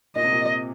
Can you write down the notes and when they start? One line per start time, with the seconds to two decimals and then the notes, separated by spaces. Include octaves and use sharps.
0.15 A#2 D#5
0.24 C3
0.32 A#2